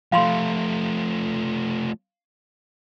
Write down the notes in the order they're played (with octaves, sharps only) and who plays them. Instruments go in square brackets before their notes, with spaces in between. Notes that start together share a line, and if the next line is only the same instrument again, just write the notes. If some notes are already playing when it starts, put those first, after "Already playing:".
[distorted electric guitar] F3 A3 [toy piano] F5 B5 C6